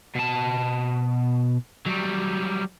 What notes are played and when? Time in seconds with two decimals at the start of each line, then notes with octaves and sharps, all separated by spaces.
0.15 B2 A5
1.86 F#3 G3